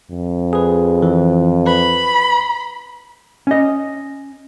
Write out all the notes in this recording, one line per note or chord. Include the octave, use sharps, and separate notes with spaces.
F2
G#4 B4
E3
B4 B5
C#4 D#5